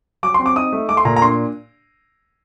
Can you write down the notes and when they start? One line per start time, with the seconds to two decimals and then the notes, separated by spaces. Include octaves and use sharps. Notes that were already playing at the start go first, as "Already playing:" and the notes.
0.23 F#3 D6
0.34 C4 C6
0.46 D6
0.56 D#4 D#6
0.73 A3
0.89 A3 D6
0.97 C6
1.05 A#2 A#5
1.16 A#5
1.21 D4 C6